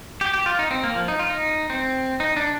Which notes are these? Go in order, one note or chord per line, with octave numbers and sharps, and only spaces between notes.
G4
G4
F4
D#4
C4
A#3
F3
D#4
F4
D#4
C4
D#4
D4